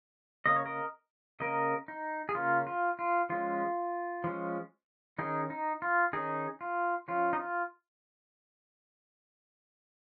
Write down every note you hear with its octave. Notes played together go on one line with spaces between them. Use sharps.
C#3 A#3 C#4 D#5
C#5
A#4 D#5
C#3 A#3 C#4 A#4 D#5
D#4
G#4
C#3 A#3 C#4 F4
F4
F4
F3 G#3 C#4 F4
F3 G#3 C#4
D#3 C#4 D#4 G#4
D#4
F4
D#3 C#4 D#4 G#4
F4
F3 C#4 F4
D#4
F4